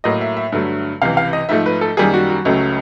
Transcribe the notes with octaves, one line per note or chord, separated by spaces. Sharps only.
A2 F#3 A#3 D#5
E5
E5
G2 D3 F#3 A3
C#2 C3 E3 F5
F5
D#5
G#2 F3 A3 E5
B4
A4
F#2 D#3 G3 A#3 G#4
F#4
F#4
C#2 C#3 F#3 A3